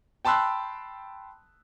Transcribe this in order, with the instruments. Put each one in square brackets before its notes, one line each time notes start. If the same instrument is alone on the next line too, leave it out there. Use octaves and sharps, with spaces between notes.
[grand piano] G5 A5 B5 C6 E6 F#6